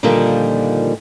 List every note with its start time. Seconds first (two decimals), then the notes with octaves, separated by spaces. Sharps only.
0.03 A#2 D3 D#3 F3 G3 A#3